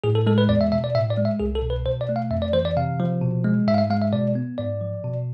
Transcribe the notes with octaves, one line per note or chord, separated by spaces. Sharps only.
A2 G#4
A4
G#3 A4
B4
E2 D5
E5
B2 E5
D5
A2 E5
D5
G#3
E5
C2 G#4
A4
B2
B4
B2 C5
D5
A3
F5
F2 E5
D5
E3 C5
D5
C3 F5
F3
B2
G#3
G#2 E5
F5
E5
G#3 F5
E5
B2 D5
B3
G#2 D5
F3
B2